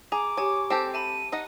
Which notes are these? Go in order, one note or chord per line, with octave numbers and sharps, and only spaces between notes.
G#4 A#5 D6
G4 C#5 G#5 D#6
C4 G4 A4 G6 E7
E5 A5 B5 D#7
D#4 D#5 F#5